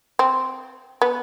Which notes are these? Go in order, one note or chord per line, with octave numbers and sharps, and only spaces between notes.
C4
B3